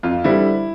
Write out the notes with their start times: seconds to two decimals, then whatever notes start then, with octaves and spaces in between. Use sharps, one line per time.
0.03 F2 F4
0.24 D3 G3 C4 E4